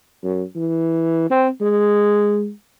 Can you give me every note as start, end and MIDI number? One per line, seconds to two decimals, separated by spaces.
0.23 0.43 42
0.56 1.28 52
1.30 1.49 60
1.61 2.51 56